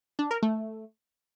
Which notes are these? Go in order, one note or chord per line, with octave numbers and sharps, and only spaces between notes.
D4
A#4
A3